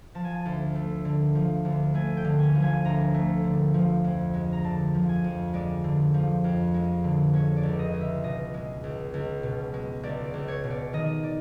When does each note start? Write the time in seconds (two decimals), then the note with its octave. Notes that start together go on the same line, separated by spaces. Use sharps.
0.15 F3 A5
0.25 G#5
0.35 A5
0.45 D2
0.75 A3
1.05 D3
1.35 F3
1.65 D2
1.94 A3 G#5
2.17 G5
2.25 D3
2.40 G#5
2.55 F3
2.62 G#5
2.85 D2 A#5
3.14 A3
3.44 D3
3.74 F3
4.04 F2
4.34 G#3
4.52 A#5
4.64 D3 A5
4.94 F3
5.09 G#5
5.24 F2
5.54 G#3 D5
5.84 D3
6.14 F3
6.44 F2
6.74 G#3
7.04 D3
7.34 G#3 C#5
7.56 D5
7.63 C#2
7.79 D#5
7.94 C#2
8.01 E5
8.24 B2 D#5
8.54 G#3
8.84 C#2
9.14 C#2
9.43 B2
9.74 G#3
10.03 C#2 D5
10.26 D5
10.34 C#2
10.48 C#5
10.64 B2
10.70 D5
10.93 D#3 D#5
11.23 D5